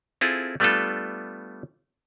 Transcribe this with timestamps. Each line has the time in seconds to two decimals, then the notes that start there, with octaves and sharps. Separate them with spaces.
0.21 C4 E4 F4 G#4 A4
0.60 G3 A3 B3 D4 F4 A4